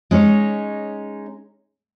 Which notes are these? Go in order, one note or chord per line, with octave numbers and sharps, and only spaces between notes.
G#3 C#4 D#4 C#5